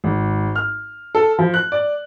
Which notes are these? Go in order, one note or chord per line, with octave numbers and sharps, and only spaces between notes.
G#1
F6
A4
F3
F#6
D5